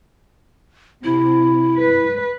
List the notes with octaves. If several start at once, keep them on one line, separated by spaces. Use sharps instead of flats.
C3 E4
B4